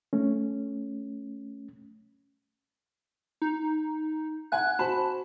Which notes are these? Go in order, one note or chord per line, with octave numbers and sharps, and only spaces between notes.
A3 C#4
D#4
F#5 G#5 F#6
F#4 C5 A5 B5